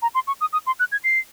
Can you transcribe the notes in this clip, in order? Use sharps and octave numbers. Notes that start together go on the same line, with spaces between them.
A#5
C6
C#6
D#6
D#6
C6
F#6
G#6
C7